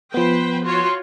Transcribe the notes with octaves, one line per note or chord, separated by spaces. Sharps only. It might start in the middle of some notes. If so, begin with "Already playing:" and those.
F3 B3 B4 C5 G5
F4 F#4 C#5 C6